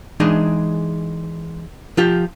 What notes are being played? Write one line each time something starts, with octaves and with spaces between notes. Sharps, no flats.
E3 G#3 D4 D#4 G#4 D#5
F3 F4 G4